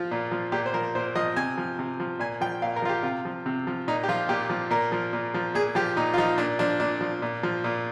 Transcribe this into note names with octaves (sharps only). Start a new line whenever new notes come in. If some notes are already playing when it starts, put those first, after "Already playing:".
Already playing: F3 F4
A#2
F3
A#2 G4
C5
F3 A#4
A#2 C5
F3 D#5
C3 G#5
F3
C3
F3
A#2 G#5
F3 G5
A#2 F5
A#4
F3 F4
G4
C3 F4
F3
C3
F3
A#2 D#4
G4
F3 F4
A#2 G4
F3
A#2 A#4
F3
A#2
F3
A#2 G#4
F3 G4
A#2 D#4
F4
F3 D#4
A#2 D4
F3 D4
A#2 D4
F3
A#2
F3
A#2